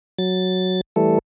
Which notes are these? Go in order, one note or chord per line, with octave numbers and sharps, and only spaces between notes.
F#3 A6
E3 G3 A3 A4